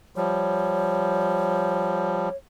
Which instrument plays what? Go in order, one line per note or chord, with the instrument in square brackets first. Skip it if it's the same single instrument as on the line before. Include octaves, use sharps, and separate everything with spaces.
[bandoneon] F3 G3 [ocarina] C#5